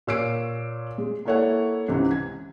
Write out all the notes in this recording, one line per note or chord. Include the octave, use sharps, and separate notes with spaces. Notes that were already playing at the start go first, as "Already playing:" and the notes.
A#2 C#5 E6 C7 D7
G#3
A#3 E4 A4 C#5 E5 F#5
C#2 G#2 C3 E3
G#6